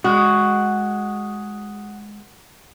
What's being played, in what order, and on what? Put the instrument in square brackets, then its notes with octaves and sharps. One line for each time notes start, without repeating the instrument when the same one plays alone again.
[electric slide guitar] G#3 [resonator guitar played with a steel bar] F#4